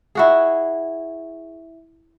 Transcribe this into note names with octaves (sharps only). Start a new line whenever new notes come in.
E4 F#4 G#4